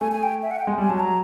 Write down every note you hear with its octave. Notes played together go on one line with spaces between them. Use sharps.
A3 G#5
G#5
G5
E5
F#5
G5
G#3 G#5
G3 G#5
F#3 A5
A#5